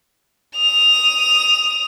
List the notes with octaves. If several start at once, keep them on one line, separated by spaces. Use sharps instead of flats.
D#6 F7